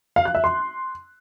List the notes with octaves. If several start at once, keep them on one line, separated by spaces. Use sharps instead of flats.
F5
F#6
E5
C6